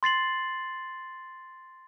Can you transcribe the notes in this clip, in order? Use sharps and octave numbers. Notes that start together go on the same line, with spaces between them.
C6 A6 C7 F#7